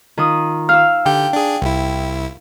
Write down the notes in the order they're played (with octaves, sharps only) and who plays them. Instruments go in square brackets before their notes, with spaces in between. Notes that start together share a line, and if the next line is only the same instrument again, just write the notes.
[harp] D#3 F4 D#6
[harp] F5 E6 [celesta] F6
[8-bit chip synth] D3 G4 G6 [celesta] G5
[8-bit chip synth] D4 G#4
C2 E4